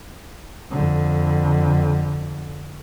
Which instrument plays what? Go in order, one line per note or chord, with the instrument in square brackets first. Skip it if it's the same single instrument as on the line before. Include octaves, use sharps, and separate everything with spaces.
[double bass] F2 D3